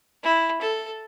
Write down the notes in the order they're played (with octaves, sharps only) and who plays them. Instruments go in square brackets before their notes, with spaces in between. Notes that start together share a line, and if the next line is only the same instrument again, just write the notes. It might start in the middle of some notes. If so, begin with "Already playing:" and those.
[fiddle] E4
A4